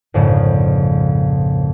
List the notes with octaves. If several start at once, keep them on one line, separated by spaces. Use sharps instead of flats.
A#1 F2 G#2 C#3